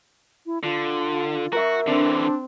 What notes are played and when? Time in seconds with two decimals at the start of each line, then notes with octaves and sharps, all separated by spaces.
0.46 E4
0.63 D3 F4
1.53 F#4 A#4 E5
1.87 D3 E3 C4 D4